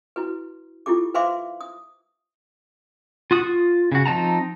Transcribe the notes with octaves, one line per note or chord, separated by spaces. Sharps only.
E4 F#4 B4
E4 F4 G4 A4 D6
B4 C5 E5 F5 C6 D6
D#6
F4 F#4 D#6
F4
C#3 F#4
F3 C4 D#4 A5 A#5